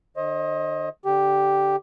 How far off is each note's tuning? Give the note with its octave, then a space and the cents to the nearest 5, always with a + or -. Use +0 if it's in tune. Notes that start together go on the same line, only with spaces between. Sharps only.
D3 +45 C5 +45 D#5 +15
D3 -5 G4 +0